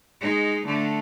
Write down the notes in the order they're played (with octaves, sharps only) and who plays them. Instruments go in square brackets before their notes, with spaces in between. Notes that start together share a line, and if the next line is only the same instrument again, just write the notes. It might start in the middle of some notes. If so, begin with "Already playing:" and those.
[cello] G#3 D#4
D3 A3